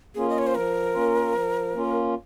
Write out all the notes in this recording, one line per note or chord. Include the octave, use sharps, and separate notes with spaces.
A#3 C#4 F4 G#4
D#5
C#5
C5
F3 A#4
A#3 C#4 F4
F3
A#3 C#4 F4